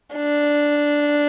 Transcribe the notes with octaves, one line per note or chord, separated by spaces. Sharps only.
D4